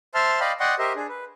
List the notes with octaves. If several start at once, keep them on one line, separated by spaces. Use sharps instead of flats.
C5 E5 A5 C6 F6
D5 D#5 F5 G5 B5
D5 D#5 F#5 G5 C6 C#6
G4 A#4 C5 D#5 E5
D4 G#4
B4